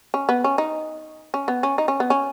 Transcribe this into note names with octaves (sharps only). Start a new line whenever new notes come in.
C#4
B3
C#4
D#4
C#4
B3
C#4
D#4
C#4
B3
C#4